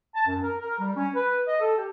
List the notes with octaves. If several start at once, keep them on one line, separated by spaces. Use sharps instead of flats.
A5
F#2
A#4
A#4
G3
C#4
B4
D#5
A4
G4